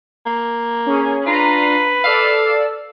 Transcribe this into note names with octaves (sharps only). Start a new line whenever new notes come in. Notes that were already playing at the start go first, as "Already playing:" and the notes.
A#3
C#4 G#4
D4 F4 B4 A#5 C7
A4 D5 F5 E6